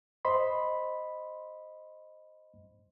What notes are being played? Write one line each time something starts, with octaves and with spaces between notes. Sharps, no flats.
C5 D#5 B5 C6